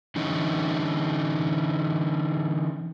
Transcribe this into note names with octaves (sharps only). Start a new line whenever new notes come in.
D3 E3 C#4 D#4